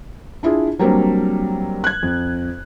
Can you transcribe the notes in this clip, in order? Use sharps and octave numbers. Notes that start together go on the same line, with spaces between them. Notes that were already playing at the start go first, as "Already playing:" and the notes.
D4 E4 F4 G#4
F#3 G3 A#3 C4 D4
F#6 G#6
F2